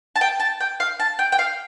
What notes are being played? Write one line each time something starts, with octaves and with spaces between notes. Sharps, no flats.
A5
G5
A5
G5
F5
A5
G5
G5
F5